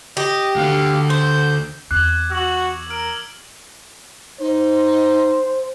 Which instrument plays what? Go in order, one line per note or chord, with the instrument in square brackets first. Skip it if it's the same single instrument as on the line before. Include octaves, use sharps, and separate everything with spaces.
[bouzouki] G4 [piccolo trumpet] D#5
[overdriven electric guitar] D2 D3 [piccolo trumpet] F5
[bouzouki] C5 [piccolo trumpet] G6
[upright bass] E2 [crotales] D6 G#6 [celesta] F#6
[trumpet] F#4 [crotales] E6 F#7
[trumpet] A#4 [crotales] F6 D7
[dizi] D#4 [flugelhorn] C5